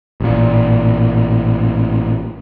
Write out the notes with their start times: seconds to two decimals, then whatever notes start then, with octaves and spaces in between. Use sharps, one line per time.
0.20 A1 A#2